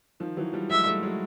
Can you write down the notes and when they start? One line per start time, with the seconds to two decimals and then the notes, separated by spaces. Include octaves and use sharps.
0.20 D#3 F3
0.37 E3 F#3
0.53 F3 G3
0.69 F#3 G#3 E5
0.86 G3 A3
1.03 F#3 G#3